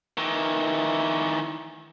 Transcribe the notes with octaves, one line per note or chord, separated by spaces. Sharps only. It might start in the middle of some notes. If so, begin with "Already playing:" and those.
D#3 E3